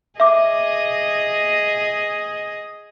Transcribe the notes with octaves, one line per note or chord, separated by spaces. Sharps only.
G#4 D#5 E5 D6